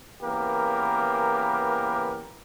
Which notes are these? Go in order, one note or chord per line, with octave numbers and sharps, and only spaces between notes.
C#3 E3 A#3 B3 G4 A#4